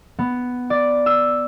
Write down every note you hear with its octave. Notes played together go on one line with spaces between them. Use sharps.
B3
D5
E6